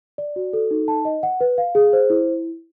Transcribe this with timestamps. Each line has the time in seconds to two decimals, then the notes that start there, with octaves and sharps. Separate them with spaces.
0.18 D5
0.36 F#4
0.53 A4
0.71 D#4
0.88 A5
1.05 D#5
1.23 F#5
1.41 B4
1.58 F5
1.75 G#4
1.93 C5
2.10 E4